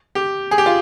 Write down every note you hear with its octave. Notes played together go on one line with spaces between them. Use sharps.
G4
G#4
G4
F4